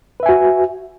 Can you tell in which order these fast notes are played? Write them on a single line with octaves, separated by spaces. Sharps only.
B4 E5 G#5 F#4